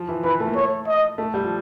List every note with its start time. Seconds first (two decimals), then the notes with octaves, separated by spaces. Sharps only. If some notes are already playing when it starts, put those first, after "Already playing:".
Already playing: F3
0.09 E3
0.24 E3 B4
0.40 A3
0.47 A#3
0.55 A3 C#5
0.87 D#5
1.18 A3
1.34 G3
1.44 F3